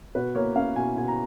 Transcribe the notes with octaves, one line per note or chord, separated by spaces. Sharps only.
B2 B4
A#3 C#5
C#4 F5
B2 G#5
B2 G#5
A#5